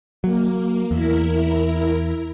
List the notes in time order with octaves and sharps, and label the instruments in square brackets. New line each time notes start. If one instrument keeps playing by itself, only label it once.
[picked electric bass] F#3 [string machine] A#3
[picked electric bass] E2 [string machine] E4 A#4